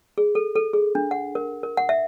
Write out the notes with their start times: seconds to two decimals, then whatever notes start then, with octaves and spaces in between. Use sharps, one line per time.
0.18 G#4
0.35 A4
0.56 A4
0.73 G#4
0.95 D4
1.11 F#5
1.35 A#4
1.63 A#4
1.77 F#5
1.89 E5